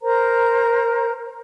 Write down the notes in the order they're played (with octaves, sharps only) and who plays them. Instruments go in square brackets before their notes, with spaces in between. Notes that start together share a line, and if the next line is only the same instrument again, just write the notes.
[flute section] A#4 C5 A#5